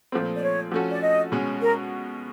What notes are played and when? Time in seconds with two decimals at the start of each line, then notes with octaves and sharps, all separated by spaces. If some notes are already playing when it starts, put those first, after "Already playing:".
0.12 A#2 F3 A3 C4
0.36 D5
0.42 C#5
0.72 F3 A3 C#4 F#4 A4
0.91 D5
1.02 D#5
1.32 B2 G#3 C#4 F#4
1.61 A#4